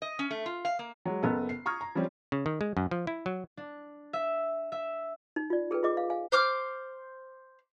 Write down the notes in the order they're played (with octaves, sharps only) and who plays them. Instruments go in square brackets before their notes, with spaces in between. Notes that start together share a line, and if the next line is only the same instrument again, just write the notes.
[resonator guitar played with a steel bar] D#5
C#4
A3
F4
F5
A#3
[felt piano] F#3 G#3
F#1 B3 A4
C7
A#5 C#6 D#6 F6 G#6
A#5
F3 G3 C4 C#4
[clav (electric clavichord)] C#3
D#3
G#3
F#2
F3
E4
F#3
[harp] D4
E5
E5
[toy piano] D#4
F4 D5
G#4 A4 B4 G5
F4 G#4 D#5 D6
F5
F5 G#5
[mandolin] C5 D6 F6